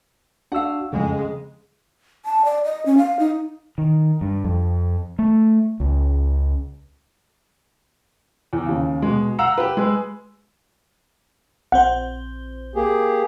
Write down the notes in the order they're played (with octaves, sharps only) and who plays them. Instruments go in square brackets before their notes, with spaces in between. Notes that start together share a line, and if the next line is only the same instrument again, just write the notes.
[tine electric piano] D4 F#4 E6 [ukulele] F5 F#5
[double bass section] F2 G#3 [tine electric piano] C#3
[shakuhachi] A5
D5
D#5
C#4
F5
D#4
[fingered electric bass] D#3
G2
F2
A3
C#2
[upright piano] E2
D#2 C#3
B2 G#3
F5 F#5 A#5 E6
G4 B4
G#3 G#4 B4
[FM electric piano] A#1 C4 C5 [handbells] F#5
[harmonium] A#3 G4 G#4